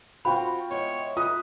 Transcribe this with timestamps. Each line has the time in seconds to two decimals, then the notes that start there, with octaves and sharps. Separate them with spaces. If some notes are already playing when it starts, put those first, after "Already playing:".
0.25 C4 F4 F#4 G5 B5
0.70 B2 G#3 E4 C#5
1.17 F4 B4 D#6